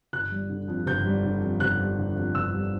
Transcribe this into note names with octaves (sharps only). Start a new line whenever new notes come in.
G1 F#6
G3
D3
F2
G1 G6
G3
D3
F2
G1 F#6
G3
D3
F2
G1 E6
G3